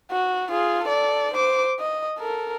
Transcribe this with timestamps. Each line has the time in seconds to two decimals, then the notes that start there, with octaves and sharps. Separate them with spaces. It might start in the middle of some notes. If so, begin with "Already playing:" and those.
0.11 F#4
0.51 F4 G#4
0.84 A4 D5
1.34 C5 D6
1.79 D#5
2.19 A4 A#4